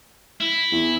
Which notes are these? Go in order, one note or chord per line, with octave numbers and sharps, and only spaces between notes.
E4
E2